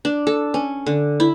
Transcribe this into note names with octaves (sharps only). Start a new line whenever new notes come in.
D4
A4
C#4
D3
E4